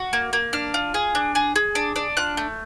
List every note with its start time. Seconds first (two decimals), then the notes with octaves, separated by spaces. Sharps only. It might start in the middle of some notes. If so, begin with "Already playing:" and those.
Already playing: F#4
0.13 A#3
0.33 A#3
0.53 D4 F6
0.74 F4
0.94 G#4
1.15 D4
1.35 G#4
1.56 G#4
1.75 D4
1.96 D4
2.17 F4 F#6
2.37 A3